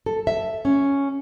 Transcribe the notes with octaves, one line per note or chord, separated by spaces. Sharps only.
A4
E5
C#4